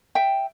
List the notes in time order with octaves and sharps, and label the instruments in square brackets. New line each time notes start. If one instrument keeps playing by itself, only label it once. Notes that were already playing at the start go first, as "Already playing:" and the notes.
[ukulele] E5 G5